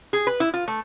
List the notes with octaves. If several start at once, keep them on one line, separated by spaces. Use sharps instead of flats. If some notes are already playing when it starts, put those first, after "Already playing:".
G#4
B4
E4
F4
A3